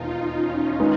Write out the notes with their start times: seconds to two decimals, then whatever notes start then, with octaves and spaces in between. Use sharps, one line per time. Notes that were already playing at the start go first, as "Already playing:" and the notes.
Already playing: E1 D#2 D#3 D#4 F4
0.34 C#4 D#4
0.80 D#3 G#3 B3 D#4